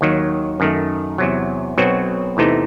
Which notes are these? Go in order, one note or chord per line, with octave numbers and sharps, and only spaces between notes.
D#2 D#3 F#3
F#2 D#3 A3
E2 C3 F#3
B1 B2 F#3 C4 F#4
E2 C3 E3 A3 D#4